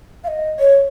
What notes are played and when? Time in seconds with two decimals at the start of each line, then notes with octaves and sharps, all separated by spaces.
0.24 F5
0.28 D#5
0.60 C#5